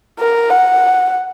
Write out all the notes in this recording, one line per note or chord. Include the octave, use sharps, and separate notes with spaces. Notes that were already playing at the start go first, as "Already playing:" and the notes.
A#4
F#5